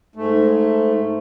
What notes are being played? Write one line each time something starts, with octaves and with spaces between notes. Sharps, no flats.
G#2 A3